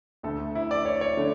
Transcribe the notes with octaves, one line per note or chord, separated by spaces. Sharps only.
D2 D3 A3 A4
E4
D5
C#5
C#5
D3 A3